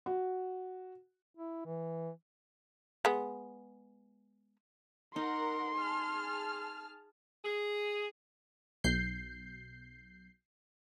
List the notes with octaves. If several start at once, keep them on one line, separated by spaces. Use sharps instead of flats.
F#4
E4
E3
G#3 B3
D#4 A#4 F#5 C6
G#4 A5 F6
G#4
B1 G6 C7